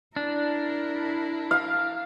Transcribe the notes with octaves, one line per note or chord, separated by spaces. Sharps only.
D4 E4 A#4
F5